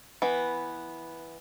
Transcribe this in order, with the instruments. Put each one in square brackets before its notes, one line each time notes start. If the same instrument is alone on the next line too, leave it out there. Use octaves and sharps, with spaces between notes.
[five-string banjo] E3 B3